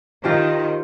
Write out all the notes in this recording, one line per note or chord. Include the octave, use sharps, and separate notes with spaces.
D#3 F4 G4 C5